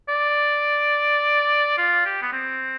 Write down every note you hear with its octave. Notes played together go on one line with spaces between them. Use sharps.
D5
F4
G4
B3
C4